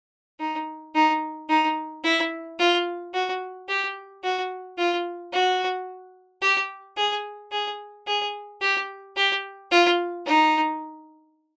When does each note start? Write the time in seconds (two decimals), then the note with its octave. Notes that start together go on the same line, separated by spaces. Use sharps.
0.40 D#4
0.95 D#4
1.49 D#4
2.04 E4
2.59 F4
3.14 F#4
3.69 G4
4.24 F#4
4.78 F4
5.33 F#4
6.42 G4
6.97 G#4
7.52 G#4
8.07 G#4
8.62 G4
9.16 G4
9.71 F4
10.26 D#4